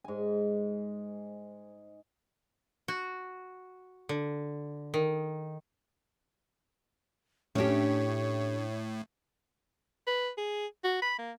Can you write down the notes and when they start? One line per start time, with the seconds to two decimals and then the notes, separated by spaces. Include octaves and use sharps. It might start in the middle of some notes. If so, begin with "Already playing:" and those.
0.04 G#2 G#5
2.88 F#4
4.09 D3
4.94 D#3
7.55 A2 A3 C#4 D4 G4 C#5
10.07 B4
10.38 G#4
10.84 F#4
11.02 B5
11.18 A#3